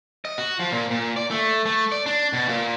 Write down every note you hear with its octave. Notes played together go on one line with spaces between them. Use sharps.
D#5
F#4
F3
A#2
A#2
D5
A3
A3
D5
D4
B2
A#2